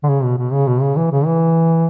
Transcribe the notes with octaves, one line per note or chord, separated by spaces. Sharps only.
D3
C#3
B2
B2
C#3
B2
C#3
E3
C#3
E3